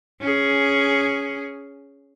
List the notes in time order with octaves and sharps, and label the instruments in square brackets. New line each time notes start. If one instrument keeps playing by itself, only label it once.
[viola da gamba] C#4 G#4